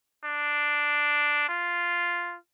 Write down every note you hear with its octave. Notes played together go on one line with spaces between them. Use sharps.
D4
F4